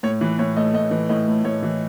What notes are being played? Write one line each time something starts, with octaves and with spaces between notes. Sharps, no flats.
A2 C#5
E3 B4
A2 C#5
A3 D#5
A2 D#5
E3
A2 D#5
A3
A2 C#5
E3